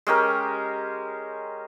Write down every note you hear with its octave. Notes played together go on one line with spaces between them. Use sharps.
G#3 C#4 G4 A#4